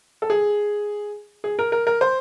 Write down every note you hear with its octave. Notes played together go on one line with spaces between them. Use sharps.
A4
G#4
G#4
A#4
A#4
A#4
C5